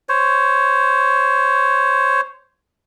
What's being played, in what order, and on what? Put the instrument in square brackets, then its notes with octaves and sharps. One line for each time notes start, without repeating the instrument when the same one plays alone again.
[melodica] C5 C#5